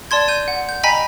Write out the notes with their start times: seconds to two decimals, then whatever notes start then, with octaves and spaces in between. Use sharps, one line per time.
0.11 D5 A5 C6 G#6
0.28 G6 D#7
0.48 F#5
0.69 G6
0.83 D#5 G5 G#5 A#5 B5 B6